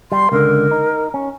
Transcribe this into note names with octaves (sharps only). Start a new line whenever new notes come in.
G3 C6
C#2 D3 A#4
D#4
C#4